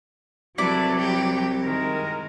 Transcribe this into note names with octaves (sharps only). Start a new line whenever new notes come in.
C2 F#3 E4 A4 B4 D5
G4 G5
D#3 G#3 A#4